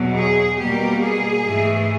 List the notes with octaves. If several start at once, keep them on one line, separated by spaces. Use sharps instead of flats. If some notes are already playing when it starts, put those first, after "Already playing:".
Already playing: E2 B2 F#3
G#4
B2 G3 A#3 G4
G#4
G#2 E3 A3